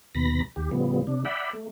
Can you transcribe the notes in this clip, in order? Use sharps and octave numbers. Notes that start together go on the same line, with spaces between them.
D#2 B2 B5 A#6
D#2 G4
A2 C#3 F3 G3 B3
C3 D4
D5 E5 F#5 G5 B5
A3